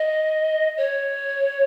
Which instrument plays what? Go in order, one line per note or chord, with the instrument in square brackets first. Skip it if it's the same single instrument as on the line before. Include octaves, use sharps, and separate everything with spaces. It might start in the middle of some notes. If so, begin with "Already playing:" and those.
Already playing: [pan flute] D#5
C#5